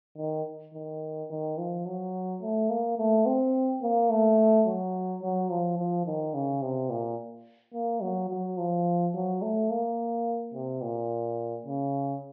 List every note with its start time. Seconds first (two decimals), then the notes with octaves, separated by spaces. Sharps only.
0.17 D#3
0.74 D#3
1.30 D#3
1.58 F3
1.86 F#3
2.42 A3
2.69 A#3
2.98 A3
3.26 C4
3.82 A#3
4.10 A3
4.66 F#3
5.22 F#3
5.50 F3
5.78 F3
6.06 D#3
6.34 C#3
6.62 C3
6.90 A#2
7.74 A#3
8.02 F#3
8.30 F#3
8.58 F3
9.14 F#3
9.42 A3
9.70 A#3
10.54 C3
10.82 A#2
11.66 C#3